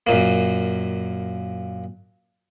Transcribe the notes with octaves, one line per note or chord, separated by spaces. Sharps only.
F#2 A#2 A#3